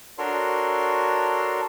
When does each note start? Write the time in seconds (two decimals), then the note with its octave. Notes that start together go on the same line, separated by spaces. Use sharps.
0.18 D4 F#4 A4 A#4 C#5 C6